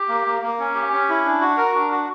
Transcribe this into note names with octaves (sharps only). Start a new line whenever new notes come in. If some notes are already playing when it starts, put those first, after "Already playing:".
Already playing: G4
A#3
A#3
A#3
C#4
G4
C#4
E4
D4
F#4
A#4
D4
F#4